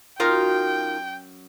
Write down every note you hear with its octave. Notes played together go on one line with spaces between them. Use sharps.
F#2 D#4 F4 A#4 G5